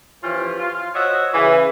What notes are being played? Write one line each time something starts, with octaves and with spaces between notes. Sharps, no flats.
E3 F3 C#4 F4 G4
F4
F#4 C5 C#5 D#5 E5
C#3 E3